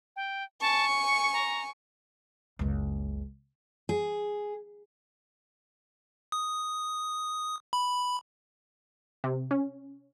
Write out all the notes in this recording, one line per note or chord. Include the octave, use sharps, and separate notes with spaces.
G5
G#5 A5 C#6
C#7
A#5
F#1 C#2
G#4
D#6
B5
C3
C#4